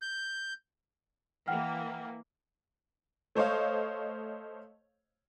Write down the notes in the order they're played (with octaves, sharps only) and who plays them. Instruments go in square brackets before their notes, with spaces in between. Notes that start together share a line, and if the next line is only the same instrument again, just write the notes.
[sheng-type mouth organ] G6
[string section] E3 A#3 [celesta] F#5 G5 F6
[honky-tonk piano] A3 C5 C#5 D#5 F5